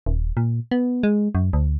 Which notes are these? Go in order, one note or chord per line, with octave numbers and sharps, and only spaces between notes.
D#1
A#2
B3
G#3
F#2
D2